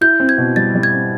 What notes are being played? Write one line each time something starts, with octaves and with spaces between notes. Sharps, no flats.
E4 G6
C4
G#6
B2
G3 A6
G3
G#6
C4